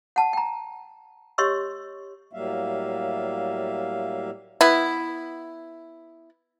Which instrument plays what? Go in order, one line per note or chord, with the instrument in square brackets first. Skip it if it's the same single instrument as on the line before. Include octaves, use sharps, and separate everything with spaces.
[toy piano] F#5 A5
G5 A#5
G4 C#5 D#5 C6 C#6 E6
[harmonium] A2 F#3 G3 A#3 E5 F5
[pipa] B3 E4